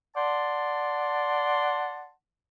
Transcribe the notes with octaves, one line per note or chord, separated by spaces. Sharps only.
D5 F#5 A5 C6